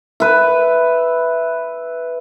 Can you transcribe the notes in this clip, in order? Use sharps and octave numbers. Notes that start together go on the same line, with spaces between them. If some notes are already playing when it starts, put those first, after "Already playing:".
B4 E5